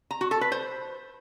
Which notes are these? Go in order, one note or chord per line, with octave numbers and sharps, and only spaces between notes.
A#5
F#4
A4
B4
C5